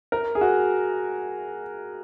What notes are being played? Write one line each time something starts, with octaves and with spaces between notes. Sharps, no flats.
A#4
G#4
F#4